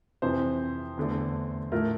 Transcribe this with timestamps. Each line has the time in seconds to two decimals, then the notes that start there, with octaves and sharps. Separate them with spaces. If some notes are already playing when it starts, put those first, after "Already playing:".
0.22 F2 C3 E3 C5
0.97 E2 D3 A3
1.72 A2 F3 A3 A#4